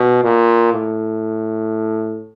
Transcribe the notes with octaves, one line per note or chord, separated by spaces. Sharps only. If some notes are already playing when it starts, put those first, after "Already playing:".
Already playing: B2
A#2
A2